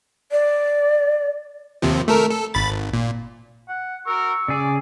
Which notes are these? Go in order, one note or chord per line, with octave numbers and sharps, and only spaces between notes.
D5
D#2 C3 F3
A3 A4 A#4
A4
G#1 B5 A6
G#1
A#2
F#5
F#4 A#4 C#6 E6
C#3 G#4 D5